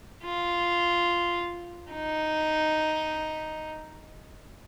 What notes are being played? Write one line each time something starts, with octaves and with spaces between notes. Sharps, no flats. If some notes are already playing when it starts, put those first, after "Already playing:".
F4
D#4